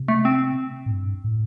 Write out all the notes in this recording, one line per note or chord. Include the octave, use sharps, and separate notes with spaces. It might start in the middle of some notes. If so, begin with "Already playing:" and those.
Already playing: C3
A3
C4
A2
G2
A2